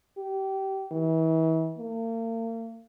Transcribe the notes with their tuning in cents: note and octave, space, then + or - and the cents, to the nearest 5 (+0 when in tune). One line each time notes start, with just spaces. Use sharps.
G4 -25
E3 -35
A#3 -40